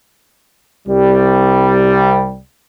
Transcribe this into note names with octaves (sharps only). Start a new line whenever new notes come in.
C2 G3